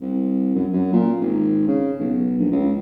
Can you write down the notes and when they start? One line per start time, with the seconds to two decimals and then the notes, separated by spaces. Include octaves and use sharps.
0.01 C2
0.55 F#2
0.73 F#2
0.93 A#2
1.21 G#1
1.68 C#3
1.99 B1
2.38 A#1
2.52 C#2